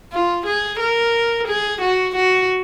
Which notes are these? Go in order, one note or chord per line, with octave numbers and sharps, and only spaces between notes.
F4
G#4
A#4
G#4
F#4
F#4